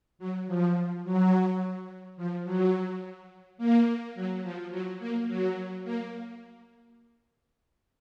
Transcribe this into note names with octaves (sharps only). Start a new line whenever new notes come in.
F#3
F3
F#3
F3
F#3
A#3
F#3
F3
F#3
A#3
F#3
A#3